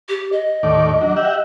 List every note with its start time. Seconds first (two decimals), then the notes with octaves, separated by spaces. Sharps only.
0.08 G4
0.32 D#5
0.63 D#2 A2 D5
1.01 F#3 D4
1.16 G4 E5 F#5